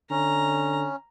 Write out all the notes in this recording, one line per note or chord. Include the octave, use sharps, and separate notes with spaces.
D3 C#4 A#5